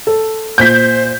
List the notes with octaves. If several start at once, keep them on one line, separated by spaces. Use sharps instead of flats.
A4
A#2 C5 G6 B6